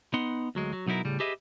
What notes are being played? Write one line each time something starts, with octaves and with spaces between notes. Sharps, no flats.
B3 D#4 F#5 C6
D2 F#3 G#3
F#3
B1 F#3 D#4 E4 A#4
A2 C#3 G3
G4 G#4 B4 D#5 E5